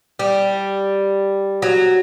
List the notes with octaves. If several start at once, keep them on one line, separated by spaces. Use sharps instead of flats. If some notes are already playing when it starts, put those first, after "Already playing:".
G3
F#3